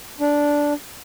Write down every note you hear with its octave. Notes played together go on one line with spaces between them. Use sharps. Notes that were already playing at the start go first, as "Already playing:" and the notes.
D4